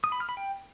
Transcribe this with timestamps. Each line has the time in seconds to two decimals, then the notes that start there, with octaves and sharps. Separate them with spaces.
0.04 D#6
0.12 B5
0.20 F6
0.29 B5
0.37 G5